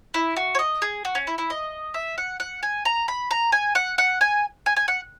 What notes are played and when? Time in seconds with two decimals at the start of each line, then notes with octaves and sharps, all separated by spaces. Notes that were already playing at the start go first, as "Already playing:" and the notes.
0.14 E4
0.36 F#4
0.55 C#5
0.59 D#5
0.82 G#4
1.05 F#4
1.15 C#4
1.27 E4
1.38 E4
1.50 D#5
1.94 E5
2.18 F#5
2.40 F#5
2.63 G#5
2.85 A#5
3.08 B5
3.31 A#5
3.52 G#5
3.75 F#5
3.98 F#5
4.21 G#5
4.66 G#5
4.77 G#5
4.88 F#5